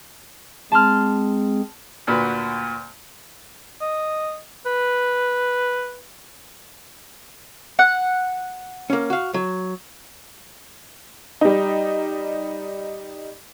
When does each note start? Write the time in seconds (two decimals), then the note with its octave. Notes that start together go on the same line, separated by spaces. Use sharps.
0.72 G#3 C4 G#4 A5 C6 F6
2.07 D2 A#2 F#4 B4
3.81 D#5
4.66 B4
7.79 F#5
8.90 A#3 C#4
9.10 F#4 F5
9.34 F#3
11.41 G3 D#4